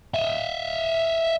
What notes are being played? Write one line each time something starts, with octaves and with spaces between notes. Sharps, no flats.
D#5 E5